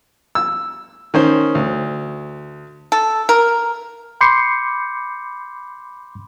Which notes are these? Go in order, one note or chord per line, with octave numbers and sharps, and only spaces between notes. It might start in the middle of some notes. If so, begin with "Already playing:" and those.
E6
D#3 C#4 C5
D2
A4
A#4
B5 C6 D6 G6 C7 C#7